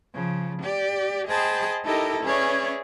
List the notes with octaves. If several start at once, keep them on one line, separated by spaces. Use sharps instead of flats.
C#3 F3
G4 D5
G#4 C5 D#5 G5 A5 B5
D#4 E4 G4 A4 A#4 D#5
C#4 G#4 B4 C#5 D5 E5